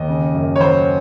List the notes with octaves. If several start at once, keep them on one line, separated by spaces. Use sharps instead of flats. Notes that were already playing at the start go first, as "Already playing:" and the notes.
Already playing: D#2 D#5
C#3
F#2
C#5
F#3 C5